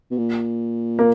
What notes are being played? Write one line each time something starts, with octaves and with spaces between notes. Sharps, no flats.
B2
A#2
A#3